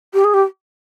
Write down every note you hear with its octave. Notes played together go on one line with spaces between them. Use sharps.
G4
G#4
G4